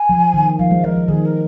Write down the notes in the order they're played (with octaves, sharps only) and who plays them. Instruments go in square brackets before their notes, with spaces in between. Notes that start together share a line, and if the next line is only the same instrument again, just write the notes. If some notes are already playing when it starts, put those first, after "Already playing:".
Already playing: [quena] G#5
[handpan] F3
D#3
[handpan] F3 [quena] F5
[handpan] G#3
[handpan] F3 [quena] A#4
[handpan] F3
[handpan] D#3 [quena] G#4
[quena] A#4